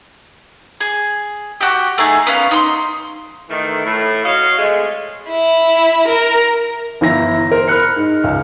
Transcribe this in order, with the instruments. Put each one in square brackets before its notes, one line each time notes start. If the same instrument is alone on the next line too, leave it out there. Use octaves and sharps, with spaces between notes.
[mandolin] G#4
F#4 G4
A3 D#4 G#4
B3 C#4 F5
D#4 C6
[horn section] D#3 E3 A3
A2 A3 E4
F#4 C#5 D#5 F5
C3 G#3 A3
[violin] E4
A#4
[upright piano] G1 E3 E4 A#5 A#6
A#4 C5
B5 F6 F#6 C#7
G#2
C#2